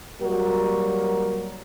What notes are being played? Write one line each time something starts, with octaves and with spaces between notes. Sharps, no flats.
F#3 G3 A#3 F#4 A#4